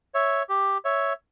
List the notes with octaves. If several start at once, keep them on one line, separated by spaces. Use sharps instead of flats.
C#5 E5
G4
C#5 E5